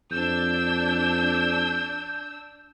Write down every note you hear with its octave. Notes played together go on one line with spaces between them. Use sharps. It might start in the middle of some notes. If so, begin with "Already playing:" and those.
F2 D4 E6 G6